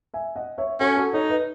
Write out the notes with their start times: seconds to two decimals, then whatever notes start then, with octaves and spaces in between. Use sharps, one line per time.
0.14 E5 G#5
0.36 D#5 F#5
0.58 C#5 E5
0.80 C#4 F#4 A4
0.97 F#4 A4
1.13 D#4 A4 C#5
1.30 B4 D#5